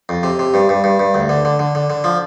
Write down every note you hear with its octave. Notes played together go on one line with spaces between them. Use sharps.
F2
C3
C3
G2
G2
G2
G2
D2
D3
D3
D3
D3
D3
F3